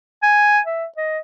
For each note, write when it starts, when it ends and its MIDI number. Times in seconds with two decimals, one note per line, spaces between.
0.23 0.59 80
0.67 0.85 76
0.97 1.19 75